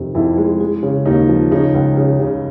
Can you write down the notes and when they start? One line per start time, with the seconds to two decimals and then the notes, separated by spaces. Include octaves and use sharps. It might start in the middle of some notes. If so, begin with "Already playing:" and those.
Already playing: F2 C3 D#3
0.15 F2 E4
0.38 G#3
0.60 G#3
0.83 C#3
1.05 D#2 D#4
1.28 F3
1.51 C#3 D#4
1.74 C#2
1.97 C#3
2.20 C#3